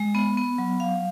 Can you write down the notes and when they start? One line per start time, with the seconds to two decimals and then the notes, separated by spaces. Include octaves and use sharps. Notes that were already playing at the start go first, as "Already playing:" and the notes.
Already playing: G#3
0.15 B3
0.37 B3
0.58 F#3
0.80 F5